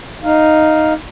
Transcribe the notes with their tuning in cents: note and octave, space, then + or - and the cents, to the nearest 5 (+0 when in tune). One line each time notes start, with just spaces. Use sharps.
D#4 +0 F5 +0